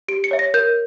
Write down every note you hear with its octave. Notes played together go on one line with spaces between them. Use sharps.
G4 D7
C#7
C#5 E5
A#6
A#4 G6